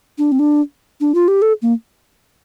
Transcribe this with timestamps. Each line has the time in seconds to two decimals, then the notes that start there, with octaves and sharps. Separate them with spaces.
0.18 D4
0.32 C4
0.39 D4
1.01 D4
1.15 F4
1.28 G4
1.42 A4
1.62 A#3